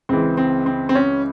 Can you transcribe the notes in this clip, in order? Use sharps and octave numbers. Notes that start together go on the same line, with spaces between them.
C#2 C#3 E3 C4
C4
C4
C4
C#4